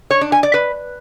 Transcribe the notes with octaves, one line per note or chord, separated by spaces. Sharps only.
C#5
D4
G#5
D5
B4